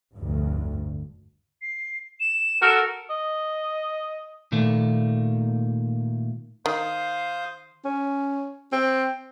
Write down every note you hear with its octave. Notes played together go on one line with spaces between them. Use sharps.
F1 D2 G2
C7
E7
F#4 A4 A#4
D#5
A#2 D#3 A3 A#3
D#3 C5 F5 D#6
C#4
C4